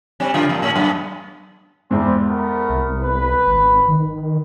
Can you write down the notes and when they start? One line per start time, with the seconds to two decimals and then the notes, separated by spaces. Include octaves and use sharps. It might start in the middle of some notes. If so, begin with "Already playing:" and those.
0.20 G3 C4 C#5
0.34 G2 C#3 F4
0.49 E2 G2 A#2
0.62 A2 C#4
0.75 F#2 B3
1.91 E2 G#2 G3 C4
2.24 A3 B3 A#4
2.70 C2
3.00 B4
3.47 G#1
3.88 D#3